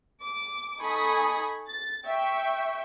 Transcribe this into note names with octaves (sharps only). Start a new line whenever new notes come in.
D6
D#4 A4 G#5 B5 C#6 D#6
A6
E5 G5 C#6